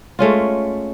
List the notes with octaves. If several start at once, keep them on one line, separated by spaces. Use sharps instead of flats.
G#3 A3 C#4 F4